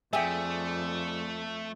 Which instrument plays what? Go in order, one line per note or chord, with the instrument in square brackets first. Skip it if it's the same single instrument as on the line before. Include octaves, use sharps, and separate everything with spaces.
[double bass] F2 [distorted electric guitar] A3 [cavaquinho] G#4 D5 [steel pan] E5 G5